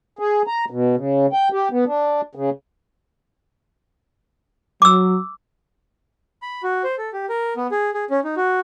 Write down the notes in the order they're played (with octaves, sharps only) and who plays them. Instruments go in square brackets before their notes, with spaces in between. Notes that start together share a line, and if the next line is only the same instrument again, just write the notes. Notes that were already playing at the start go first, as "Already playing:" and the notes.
[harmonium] G#4
A#5
B2
C#3
G5
G4
B3
D4
C#3
[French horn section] F#3 [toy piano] D6 E6
[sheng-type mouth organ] B5
F#4
C5
A4
G4
A#4
B3
G#4
G#4
C#4
D#4
F#4